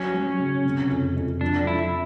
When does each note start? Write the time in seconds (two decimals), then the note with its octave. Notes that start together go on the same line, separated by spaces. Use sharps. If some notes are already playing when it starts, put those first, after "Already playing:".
Already playing: F#3 C#4
0.14 F#3
0.39 C#3
0.65 C3
0.90 F2
1.16 F2
1.41 F3 D4
1.67 F3 E4